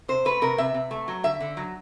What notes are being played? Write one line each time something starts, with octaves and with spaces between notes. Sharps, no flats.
C3 C5
A3 B4
C3 A#4
C3 E5
C3
A3
F#3
D3 E5
D3
F#3